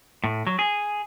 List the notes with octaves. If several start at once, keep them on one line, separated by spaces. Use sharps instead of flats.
A2
F#3
G#4